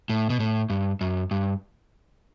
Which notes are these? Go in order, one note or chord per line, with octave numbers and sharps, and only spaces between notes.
A2
B2
A2
G2
F#2
G2